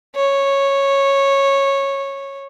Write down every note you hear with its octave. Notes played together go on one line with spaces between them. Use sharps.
C#5